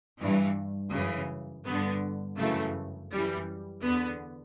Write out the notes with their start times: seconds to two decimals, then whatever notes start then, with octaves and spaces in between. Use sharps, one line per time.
0.20 G2 E3
0.93 F#2 C#3 E3
1.65 G2 D3 B3
2.38 F#2 C#3 E3 A3
3.11 F#2 E3 G3
3.83 E2 D3 B3